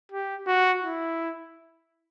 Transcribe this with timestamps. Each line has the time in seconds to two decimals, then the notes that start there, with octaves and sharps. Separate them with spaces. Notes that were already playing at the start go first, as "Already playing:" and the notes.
0.12 G4
0.47 F#4
0.83 E4